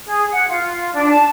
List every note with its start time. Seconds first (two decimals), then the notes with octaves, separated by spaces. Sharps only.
0.04 G#4
0.31 F#5
0.49 F4
0.93 D4
1.09 A5